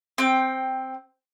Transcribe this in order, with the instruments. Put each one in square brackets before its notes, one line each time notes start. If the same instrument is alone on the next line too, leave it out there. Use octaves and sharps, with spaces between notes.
[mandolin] C4 G5